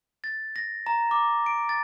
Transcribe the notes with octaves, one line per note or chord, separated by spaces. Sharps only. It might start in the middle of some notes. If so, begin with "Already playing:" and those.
A6
A#6
A#5
D6
D7
A6